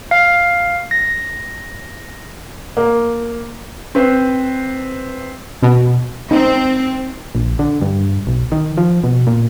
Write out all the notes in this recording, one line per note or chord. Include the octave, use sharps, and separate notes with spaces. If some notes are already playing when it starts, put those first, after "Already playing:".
F5
A#6
A#3
C4 B4 C5
B2
C4 D#4
A#1
D3
G2
B1
D#3
F3
B2
A#2